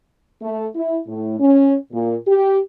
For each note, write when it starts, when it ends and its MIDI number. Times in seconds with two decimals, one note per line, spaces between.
0.42 0.67 57
0.75 0.98 64
1.07 1.38 45
1.40 1.76 61
1.92 2.16 46
2.27 2.61 67